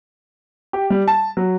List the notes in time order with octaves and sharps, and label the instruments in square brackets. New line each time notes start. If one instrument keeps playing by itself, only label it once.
[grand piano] G4
G3
A5
F#3